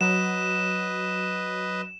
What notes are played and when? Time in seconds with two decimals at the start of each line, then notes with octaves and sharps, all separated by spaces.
0.01 F#3 B4 D#5 E7